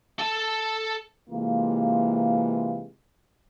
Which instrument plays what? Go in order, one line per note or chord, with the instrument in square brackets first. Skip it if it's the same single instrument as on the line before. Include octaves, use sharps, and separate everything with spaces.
[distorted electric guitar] A4 A5
[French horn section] C3 E3 G#3 A#3 F4